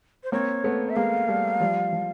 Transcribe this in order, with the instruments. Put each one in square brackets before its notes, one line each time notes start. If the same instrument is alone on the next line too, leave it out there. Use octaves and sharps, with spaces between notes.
[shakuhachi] C5
[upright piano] A#3 C4 [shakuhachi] C#5
[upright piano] A3 B3
[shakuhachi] E5
[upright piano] G#3 A#3 [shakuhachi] F5
[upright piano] G3 A3
F3 G3
F3